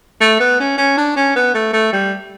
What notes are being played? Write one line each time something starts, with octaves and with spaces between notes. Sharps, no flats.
A3
B3
C#4
C#4
D4
C#4
B3
A3
A3
G3